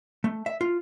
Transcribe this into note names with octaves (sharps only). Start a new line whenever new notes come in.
A3
E5
F4